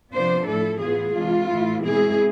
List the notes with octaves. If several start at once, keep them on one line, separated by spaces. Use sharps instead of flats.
C3 F3 B3 D4 F4 C5
A2 F3 A3 E4 A4
A2 E3 B3 F4 G#4
C3 E3 G#3 D4 F4
A2 E3 A3 E4
B2 G#3 C4 E4 G#4